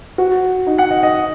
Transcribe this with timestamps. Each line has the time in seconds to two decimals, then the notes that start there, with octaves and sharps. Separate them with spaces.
0.18 F#4
0.67 D#4
0.78 F#5
0.91 D#5
1.03 D#5